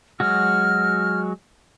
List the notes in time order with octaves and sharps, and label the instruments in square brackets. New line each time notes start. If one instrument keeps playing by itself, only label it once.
[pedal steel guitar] F#3 G#3 F#4 [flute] F6